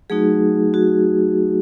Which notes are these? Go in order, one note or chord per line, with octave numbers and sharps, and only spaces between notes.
F#3 A3 D#4 F#4 G#4
F#4